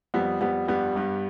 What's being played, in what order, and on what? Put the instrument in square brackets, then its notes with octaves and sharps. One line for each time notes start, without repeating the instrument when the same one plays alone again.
[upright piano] F2 G3 B3
F2 G3 B3
G2 G3 B3
G2